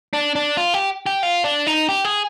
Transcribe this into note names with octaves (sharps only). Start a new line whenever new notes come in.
D4
D4
F4
G4
G4
F4
D4
D#4
G4
G#4